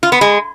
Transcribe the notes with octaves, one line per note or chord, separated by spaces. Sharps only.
F4
B3
G#3